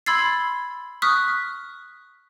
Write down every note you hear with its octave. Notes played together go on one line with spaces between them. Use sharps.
B5 C6 E6 G#6 A6 C7
C#6 D#6 F6 F#6 B6